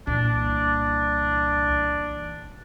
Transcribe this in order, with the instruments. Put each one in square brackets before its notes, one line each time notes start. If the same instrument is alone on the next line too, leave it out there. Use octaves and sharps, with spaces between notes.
[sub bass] C2 [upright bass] A#2 E3 [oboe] D4